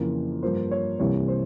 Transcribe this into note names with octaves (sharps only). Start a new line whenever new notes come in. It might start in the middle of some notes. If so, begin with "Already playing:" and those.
Already playing: F2 C#3 E3 A#3
G2 F3 A#3 C5
C#5
C2 C3 E3 G3 A#3 C#5
C5